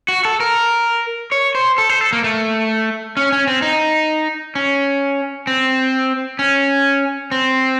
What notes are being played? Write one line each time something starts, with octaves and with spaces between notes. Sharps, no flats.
F#4
A4
A#4
C#5
C5
A4
C5
A4
A#3
A3
C#4
C#4
C4
D#4
C#4
C4
C#4
C4